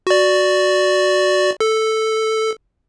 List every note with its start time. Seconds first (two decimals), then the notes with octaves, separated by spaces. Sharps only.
0.07 F#4 D5
1.60 A4